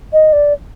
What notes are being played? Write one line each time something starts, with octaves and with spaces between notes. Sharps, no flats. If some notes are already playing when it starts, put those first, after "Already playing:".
D#5
D5